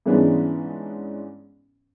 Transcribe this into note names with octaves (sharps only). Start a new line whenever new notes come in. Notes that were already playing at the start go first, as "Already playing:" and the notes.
G#2 E3 G#3 B3 C#4 D4